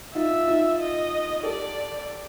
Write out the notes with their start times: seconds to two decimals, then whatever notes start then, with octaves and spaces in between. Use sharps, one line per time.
0.15 D#4 F4 E5
0.47 D#4 F4
0.79 D#5
1.43 G4 A4 D5